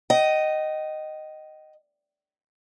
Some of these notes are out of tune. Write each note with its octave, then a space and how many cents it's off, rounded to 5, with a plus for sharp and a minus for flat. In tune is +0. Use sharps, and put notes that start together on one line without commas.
D#5 -5 G5 -35